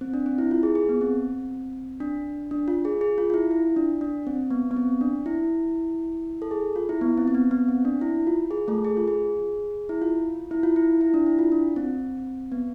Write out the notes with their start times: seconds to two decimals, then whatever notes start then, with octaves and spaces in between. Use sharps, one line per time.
0.01 C4
0.14 D4
0.26 C4
0.38 E4
0.51 F4
0.63 G#4
0.75 G#4
0.89 B3
1.01 C4
2.00 D4
2.51 D4
2.68 F4
2.85 G#4
3.01 G#4
3.18 F4
3.30 F4
3.34 E4
3.51 E4
3.76 D4
4.01 D4
4.27 C4
4.50 B3
4.71 B3
4.76 C4
5.01 D4
5.26 E4
6.42 A4
6.51 G#4
6.76 F4
6.89 E4
7.01 B3
7.18 C4
7.28 C4
7.35 B3
7.51 B3
7.68 C4
7.85 D4
8.01 E4
8.27 F4
8.51 G#4
8.68 A3 A4
8.85 G#4
8.97 F4
9.08 G#4
9.89 E4
10.02 F4
10.51 E4
10.63 F4
10.76 E4
11.01 E4
11.14 D4
11.26 E4
11.39 F4
11.52 D4
11.76 C4
12.52 B3